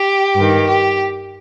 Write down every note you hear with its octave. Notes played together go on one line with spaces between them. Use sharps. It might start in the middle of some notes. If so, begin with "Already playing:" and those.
Already playing: G4
G2
D#3
G4